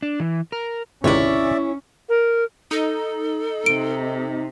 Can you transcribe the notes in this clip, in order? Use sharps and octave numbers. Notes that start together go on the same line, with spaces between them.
D4
E3
A#4
G#1 C#2 C3 C#4 E4 C#5 D5 E5
A#4
D#4 A4
C3 D7